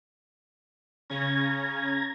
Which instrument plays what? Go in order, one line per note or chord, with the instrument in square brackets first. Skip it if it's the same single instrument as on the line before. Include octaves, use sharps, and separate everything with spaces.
[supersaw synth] C#3 C#4 [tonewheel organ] A#5 G#6